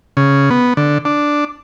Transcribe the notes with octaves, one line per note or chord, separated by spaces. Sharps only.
C#3
B3
D3
D4